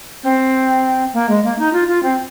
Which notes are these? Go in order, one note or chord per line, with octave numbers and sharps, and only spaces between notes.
C4
A#3
G#3
A#3
D#4
F4
F4
C4